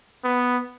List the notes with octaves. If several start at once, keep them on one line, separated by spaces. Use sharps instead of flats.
B3